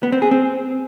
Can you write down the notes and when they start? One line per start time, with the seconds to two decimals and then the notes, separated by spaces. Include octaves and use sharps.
0.03 B3
0.12 C4
0.22 G#4
0.31 C4